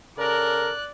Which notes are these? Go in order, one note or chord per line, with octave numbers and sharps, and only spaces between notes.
C#3 A4 A#4 D5 F#6